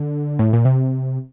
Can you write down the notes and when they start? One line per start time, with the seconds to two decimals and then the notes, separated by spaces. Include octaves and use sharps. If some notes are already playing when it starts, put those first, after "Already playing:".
Already playing: D3
0.39 A2
0.53 A#2
0.65 C3